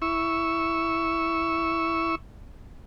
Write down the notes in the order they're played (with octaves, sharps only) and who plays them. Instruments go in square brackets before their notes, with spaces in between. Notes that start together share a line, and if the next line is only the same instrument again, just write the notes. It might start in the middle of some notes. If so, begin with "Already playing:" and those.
[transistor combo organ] E4 C#6 E6